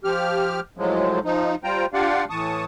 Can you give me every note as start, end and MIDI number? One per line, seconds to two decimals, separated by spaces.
0.04 0.60 53
0.04 0.60 67
0.04 0.60 89
0.78 1.19 45
0.78 1.19 53
0.78 1.19 54
0.78 1.19 56
1.24 1.55 53
1.24 1.55 63
1.64 1.86 55
1.64 1.86 65
1.64 1.86 72
1.64 1.86 79
1.64 1.86 82
1.93 2.25 62
1.93 2.25 65
1.93 2.25 67
1.93 2.25 74
1.93 2.25 77
1.93 2.25 78
2.30 2.65 45
2.30 2.65 52
2.30 2.65 81
2.30 2.65 85
2.30 2.65 87